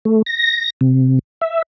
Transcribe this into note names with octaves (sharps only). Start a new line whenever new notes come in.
A3
A#6
C3
E5